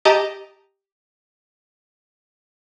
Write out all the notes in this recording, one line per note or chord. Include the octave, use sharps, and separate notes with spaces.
G4 D#5 A5 A#5